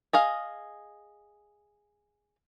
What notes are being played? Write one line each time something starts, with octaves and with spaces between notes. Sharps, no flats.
G#4 D#5 F5